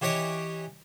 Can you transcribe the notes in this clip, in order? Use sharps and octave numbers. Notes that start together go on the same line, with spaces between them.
E3 G4 C#5 D#5 G5